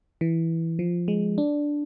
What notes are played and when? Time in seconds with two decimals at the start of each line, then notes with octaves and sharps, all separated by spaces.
0.21 E3
0.79 F3
1.08 G#3
1.38 D4